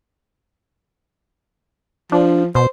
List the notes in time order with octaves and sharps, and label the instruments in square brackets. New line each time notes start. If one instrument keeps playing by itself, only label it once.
[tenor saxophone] F3 [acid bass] D4
[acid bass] B2 [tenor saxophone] C5